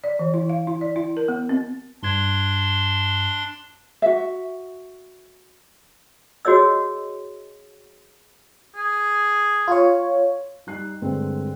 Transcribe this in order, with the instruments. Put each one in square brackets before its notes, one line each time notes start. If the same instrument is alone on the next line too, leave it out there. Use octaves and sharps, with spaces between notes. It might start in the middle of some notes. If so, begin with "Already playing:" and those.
[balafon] D5
E3
E4
F5
E4
D5
E4
A#4
B3
C4
[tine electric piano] G2 G#6 [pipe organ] D4 C6
[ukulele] F#4 E5
[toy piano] F#4 G#4 C#5 D#5 E6
[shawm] G#4
[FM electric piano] F4 C#5
[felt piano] G3 D#4 F#6 C7
G2 D3 G#3 A3 C4